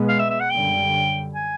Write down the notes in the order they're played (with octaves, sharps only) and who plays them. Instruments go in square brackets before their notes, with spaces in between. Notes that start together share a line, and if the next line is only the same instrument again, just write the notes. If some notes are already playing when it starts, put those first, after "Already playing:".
Already playing: [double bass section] B2 G#3 B3
[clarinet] F5
E5
E5
F#5
[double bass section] F#2 D3 G3 [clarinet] G5
[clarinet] G#5